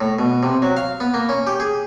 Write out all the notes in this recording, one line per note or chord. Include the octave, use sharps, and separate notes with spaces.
A2
B2
C3
F#3
F5
B3
A#3
C#4
G4
G#4